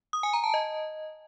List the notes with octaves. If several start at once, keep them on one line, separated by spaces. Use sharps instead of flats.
D#6
G#5
A#5
A5
D#5